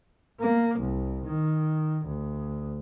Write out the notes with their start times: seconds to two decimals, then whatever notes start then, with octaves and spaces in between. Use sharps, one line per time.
0.41 A#3
0.80 C2
1.25 D#3
2.06 D2